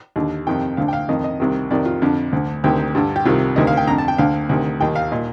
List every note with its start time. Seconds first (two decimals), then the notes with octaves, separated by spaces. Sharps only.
0.16 D#2 D3
0.47 F2 C3 D#3 G5
0.77 D2 D3 F5
0.88 G5
0.93 F5
1.09 F2 D#3 D#5
1.24 D#5
1.40 C2 C3 D#3
1.70 F2 C3 D#3 D5
1.86 F4
2.02 F2 D3
2.33 D2 D3
2.64 D2 C3 D#3 G4
2.95 G2 D3
3.16 G4
3.25 C2 C3 D#3 F4
3.56 D2 C3 D#3 D#5
3.67 F5
3.77 G5
3.87 F2 D3 A#5
3.98 A5
4.08 G5
4.18 D2 D3 F5
4.49 D2 C3 D#3
4.80 D#2 D#3 G5
4.96 F5
5.11 A#2 D#5